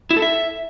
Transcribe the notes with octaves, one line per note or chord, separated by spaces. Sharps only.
E4
A4
E5